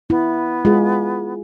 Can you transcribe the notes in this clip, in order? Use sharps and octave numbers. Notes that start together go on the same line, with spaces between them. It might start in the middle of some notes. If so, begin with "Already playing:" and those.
B3 E4
G#3 F4 G#4